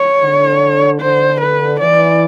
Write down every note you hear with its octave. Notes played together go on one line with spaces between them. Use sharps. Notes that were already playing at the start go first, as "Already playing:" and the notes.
Already playing: C#5
D3
D3 C5
B4
E3 D5